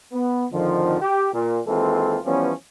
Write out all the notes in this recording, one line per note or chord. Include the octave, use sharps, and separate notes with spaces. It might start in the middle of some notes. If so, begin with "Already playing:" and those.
B3
F2 G#2 D3 D#3 F3
G4
A#2
D#2 E3 G#3 C4 F4 A4
E3 F3 G3 B3 C#4